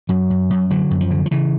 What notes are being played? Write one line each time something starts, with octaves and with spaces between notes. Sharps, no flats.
F#2 F#3
F#2
F#2
D3 F#3
F#2
F3
D3
F3
C#3 E3